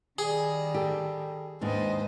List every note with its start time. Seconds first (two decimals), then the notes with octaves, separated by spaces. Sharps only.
0.18 D#3 G3 G#4
0.74 G4 A4
1.61 D#2 G#2 D4 B4 C5 D#5